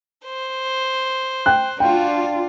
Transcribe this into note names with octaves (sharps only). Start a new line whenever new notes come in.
C5
G5 F#6
D4 F4 F#4 G5